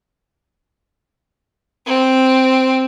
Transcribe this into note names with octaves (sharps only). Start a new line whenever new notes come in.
C4